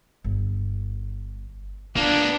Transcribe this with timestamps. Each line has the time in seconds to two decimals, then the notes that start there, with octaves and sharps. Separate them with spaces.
0.24 G1
1.96 A#3 B3 D4 F4